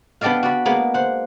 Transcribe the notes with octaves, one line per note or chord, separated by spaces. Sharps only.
B3 D4 G4 D5 D#5 F5
F#4 D5 B5
G#3 A#3 B3
C5 F#5